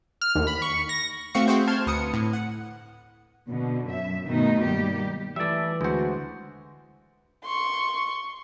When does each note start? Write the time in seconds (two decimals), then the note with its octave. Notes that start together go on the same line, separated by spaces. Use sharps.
0.21 F6
0.35 D#2
0.47 B5
0.62 C#6
0.89 A#6
1.35 A3 C4 F#4 F5 C#6 C#7
1.48 C4 F#4 G#4 C5
1.68 A5 C6 F6 G#6
1.86 D2 B4 D#6 C#7
2.14 A2
2.33 F#5
3.47 B2 D3
3.87 F#2 E5
4.28 G2 B2 D#3 A3 B3 D#4
4.62 G3 A#3 G4
5.36 E3 G3 A3 D5 E5
5.81 D2 G#3 F#4 C5
7.45 C6 C#6